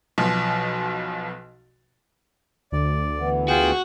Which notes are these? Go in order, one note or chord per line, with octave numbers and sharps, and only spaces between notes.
B1 B2 F3
D2 D5
E3 B3
F4 F#4 G#4 G5